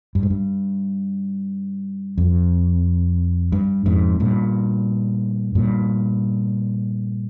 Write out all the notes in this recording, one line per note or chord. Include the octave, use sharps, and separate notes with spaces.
G2
G#2
G2
F2
G2
F2 G#2
G2 A#2
G2 A#2